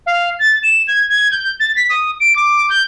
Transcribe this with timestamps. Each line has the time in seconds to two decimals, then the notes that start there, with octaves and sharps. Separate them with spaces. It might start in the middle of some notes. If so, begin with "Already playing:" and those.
0.06 F5
0.39 A6
0.63 E7
0.88 G#6
1.09 G#6
1.32 G6
1.60 A6
1.76 B6
1.90 D#6
2.20 D7
2.36 D6
2.70 G6